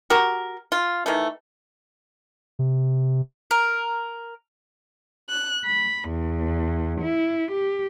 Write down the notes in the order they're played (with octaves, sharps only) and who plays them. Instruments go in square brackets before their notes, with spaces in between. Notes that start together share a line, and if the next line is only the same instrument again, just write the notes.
[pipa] F#4 G4 A#4
F4
D#3 E3 A3
[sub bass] C3
[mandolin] A#4
[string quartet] F#6
B5
E2
E4
G4